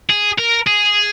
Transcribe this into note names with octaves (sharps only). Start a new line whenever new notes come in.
G#4
A#4
G#4